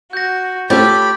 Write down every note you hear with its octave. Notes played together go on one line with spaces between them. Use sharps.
F#4 G6 A#6
A3 C#4 F4 G4 B5 D6 G6 A6